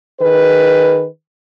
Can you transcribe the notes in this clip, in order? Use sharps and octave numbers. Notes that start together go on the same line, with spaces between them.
D#3 G#4 B4